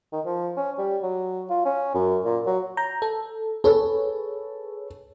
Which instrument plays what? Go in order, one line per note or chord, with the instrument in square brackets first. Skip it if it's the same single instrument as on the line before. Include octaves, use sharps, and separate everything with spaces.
[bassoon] D#3
F3
C#4
G3
F#3
F4
C#4
F#2
A#2
F#3
[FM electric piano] A#5 G6
A4
[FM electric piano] G#4 B4 C#5 [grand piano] A4